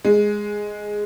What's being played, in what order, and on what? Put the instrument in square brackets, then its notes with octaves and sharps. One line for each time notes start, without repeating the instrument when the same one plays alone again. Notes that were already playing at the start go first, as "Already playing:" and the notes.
[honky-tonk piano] G#3